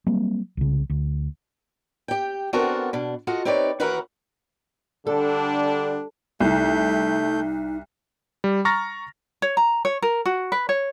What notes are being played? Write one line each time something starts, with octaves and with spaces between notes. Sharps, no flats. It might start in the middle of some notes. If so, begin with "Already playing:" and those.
F#3 G3 A#3 C4
C2 C#3
D2
G4 G5
B3 C4 D4 F#4 A4 A#4
B2 D4
F4 F#4 A4 D#5 F#5
C4 D#4 G4 B4 C#5 D5
D#2 E3 F#4 A#4 B4 F#5
D3 G3 D4 A4
C2 A3 D#4 G6
G3
A#5 C#6 F6 A6 A#6
C#5
A#5
C#5
A#4
F#4
B4
C#5